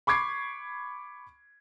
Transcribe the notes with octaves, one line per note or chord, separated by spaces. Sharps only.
B5 C#6 D6 G#6 C7